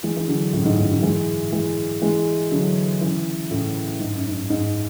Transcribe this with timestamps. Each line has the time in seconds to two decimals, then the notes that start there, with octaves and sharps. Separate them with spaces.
0.03 E3 G#3
0.17 E3
0.28 D3 F#3
0.53 F#2 A2
0.66 G#2
0.77 F#2 A2
0.90 D3 F#3
1.02 E3 G#3
1.52 E3 G#3
2.02 E3 G#3
2.52 D3 F#3
3.01 C#3 E3
3.51 A2 C#3
4.00 G#2
4.14 F#2
4.28 G#2
4.50 G#2